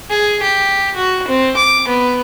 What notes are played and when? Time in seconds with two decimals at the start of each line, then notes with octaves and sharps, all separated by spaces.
0.10 G#4
0.42 G4
0.96 F#4
1.28 C4
1.57 D6
1.88 B3